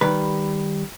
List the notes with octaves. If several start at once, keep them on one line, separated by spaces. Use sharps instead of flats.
D#3 G3 B4